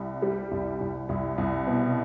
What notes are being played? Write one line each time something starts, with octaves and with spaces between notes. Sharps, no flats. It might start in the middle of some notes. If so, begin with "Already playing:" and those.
Already playing: C2
G3
C2
C2
C2
C2
B2